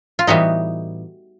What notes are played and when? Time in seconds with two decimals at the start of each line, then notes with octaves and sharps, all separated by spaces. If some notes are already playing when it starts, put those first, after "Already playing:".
0.19 F4
0.27 A2 E3 G3 B3 D#4 F#4